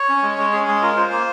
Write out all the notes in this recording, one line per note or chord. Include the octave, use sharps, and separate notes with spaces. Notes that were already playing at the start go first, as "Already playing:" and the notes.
Already playing: C#5
C#4
G#3
G#3
C#4 G#4
G#3 G#4
F4 A#4
F4 C5
A#3